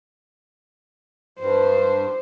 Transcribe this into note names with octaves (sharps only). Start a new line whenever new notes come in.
G2 C5